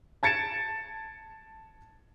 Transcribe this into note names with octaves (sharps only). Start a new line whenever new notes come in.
A5 G#6 A6 C#7 D7 E7